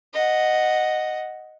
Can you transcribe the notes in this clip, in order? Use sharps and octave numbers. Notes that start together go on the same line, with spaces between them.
D#5 F#5